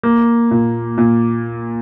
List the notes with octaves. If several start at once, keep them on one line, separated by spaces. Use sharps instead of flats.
A#3
A#2
A#2